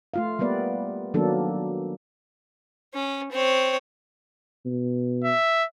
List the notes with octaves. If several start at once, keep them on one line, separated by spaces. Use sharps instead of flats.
A3 F4 F5
G3 A#3 B3 B4 D5
D#3 F#3 A#3 B3 D4 A4
C#4
C4 C#5
B2
E5